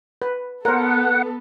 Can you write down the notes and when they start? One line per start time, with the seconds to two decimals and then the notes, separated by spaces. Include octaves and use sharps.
0.22 B4
0.65 B3 A4 A#4 C5 F#5